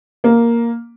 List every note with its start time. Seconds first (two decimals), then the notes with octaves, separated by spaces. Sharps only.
0.24 A#3